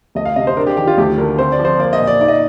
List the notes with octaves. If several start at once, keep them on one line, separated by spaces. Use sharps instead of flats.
D2 D#5
F5
C3 D#5
C5
D4 A#4
G4
D#3 G4
F4
D2 G4
D3 A#4
C4 C5
D5
F3
C5
A#3 D5
D#5
A#2
D5
D#4 D5
D#5